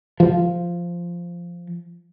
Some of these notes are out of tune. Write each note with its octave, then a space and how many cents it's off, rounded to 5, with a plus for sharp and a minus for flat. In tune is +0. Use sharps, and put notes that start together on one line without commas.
F3 -10